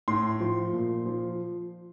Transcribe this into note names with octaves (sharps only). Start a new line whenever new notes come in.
A2 C6
F3
A#2
F3